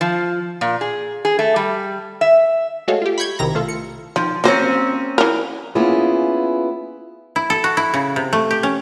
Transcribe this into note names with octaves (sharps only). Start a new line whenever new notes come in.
F3
A#2
G#4
G#4
A3
G3
E5
G#3 A3 F#4 A4 C#5 F5
F4 G4
B5 C#6 G6 G#6
B1 C3 D#3 E4 A#5 A#6
A3 F4 A4
C#7
D#3 F3
F#3 A#3 C4 C#4 C5 C#5
E3 A#4
A#3 B3 C#4 E4 F4 G#4
E4
A4
F#4
E4
C#3
C3
A3
G4
C#4